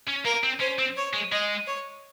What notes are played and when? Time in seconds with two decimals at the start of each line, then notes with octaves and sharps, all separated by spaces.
0.08 C#4
0.25 A#3 A#4
0.44 C4
0.60 C#4 C5
0.79 C4
0.97 C#5
1.13 G#3
1.32 G#3 D#5
1.67 C#5